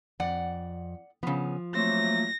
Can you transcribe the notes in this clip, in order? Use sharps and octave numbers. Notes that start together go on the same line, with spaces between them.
F2 D5 F#5
C#3 F3 B3
F#3 A3 A#3 C4 A#6